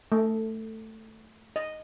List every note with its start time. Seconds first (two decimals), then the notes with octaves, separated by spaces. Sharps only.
0.12 A3
1.56 D#5